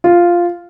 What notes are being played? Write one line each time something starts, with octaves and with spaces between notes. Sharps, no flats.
F4